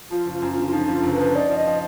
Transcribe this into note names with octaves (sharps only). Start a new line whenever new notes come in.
F3 F4
F#1
F4
F#2
F4
D3
F4
F3 D#4
D3 F4
F#1
B4
F3
D#4 D5
F3
D#5
F3